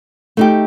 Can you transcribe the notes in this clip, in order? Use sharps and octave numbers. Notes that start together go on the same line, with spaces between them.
A3 D#4 G4